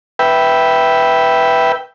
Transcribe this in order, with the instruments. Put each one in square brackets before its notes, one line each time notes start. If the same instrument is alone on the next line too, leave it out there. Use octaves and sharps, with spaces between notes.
[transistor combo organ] B4 E5 G5